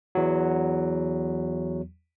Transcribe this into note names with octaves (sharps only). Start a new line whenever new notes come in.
E2 F#3